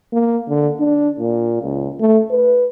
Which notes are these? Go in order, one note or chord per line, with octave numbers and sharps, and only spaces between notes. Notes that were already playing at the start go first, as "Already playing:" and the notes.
A#3
D3
D4
A#2
C#2
A3
B4